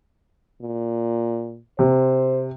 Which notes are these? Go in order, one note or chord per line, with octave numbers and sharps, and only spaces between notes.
A#2
C3 C5